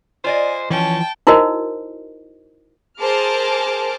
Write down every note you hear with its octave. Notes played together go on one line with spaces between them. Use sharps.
F4 C5 D5 D#5 G#5
E3 F3 C#4 G5 A5
D#4 E4 F#4 A#4 C5 D#5
G#4 A#4 C5 A5 D6 F6